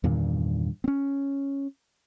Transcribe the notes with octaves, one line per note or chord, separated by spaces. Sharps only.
E2 G2 A#2 D#3
C4 C#4